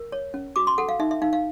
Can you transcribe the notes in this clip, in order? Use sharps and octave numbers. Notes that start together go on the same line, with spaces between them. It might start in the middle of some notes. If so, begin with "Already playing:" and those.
Already playing: A#4
C#5
C#4
F#4 D6
C6
A4 F#5
F5
D#4 E5
E5
D#4 F5
F5